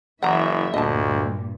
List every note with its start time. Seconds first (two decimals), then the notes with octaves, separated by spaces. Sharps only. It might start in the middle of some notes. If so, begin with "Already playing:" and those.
0.22 F#1 E3 E5 F#5 A#5
0.74 D2 G2 A#2 D#5 A5